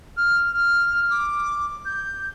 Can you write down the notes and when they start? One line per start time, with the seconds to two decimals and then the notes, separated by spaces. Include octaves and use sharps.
0.16 F6
1.10 D6
1.85 G6